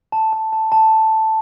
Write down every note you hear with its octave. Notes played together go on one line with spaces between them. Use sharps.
A5
A5
A5
A5